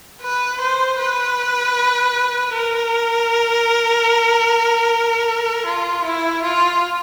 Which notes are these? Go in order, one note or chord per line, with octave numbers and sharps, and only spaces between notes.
B4
C5
B4
A#4
F4
E4
F4